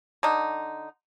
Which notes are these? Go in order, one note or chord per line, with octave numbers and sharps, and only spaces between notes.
D3 D#4